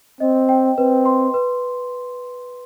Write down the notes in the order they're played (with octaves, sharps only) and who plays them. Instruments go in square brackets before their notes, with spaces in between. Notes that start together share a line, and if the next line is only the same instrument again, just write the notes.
[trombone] C4 [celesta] D#5
[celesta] G5
[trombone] C4 [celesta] B4
[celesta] C6
B4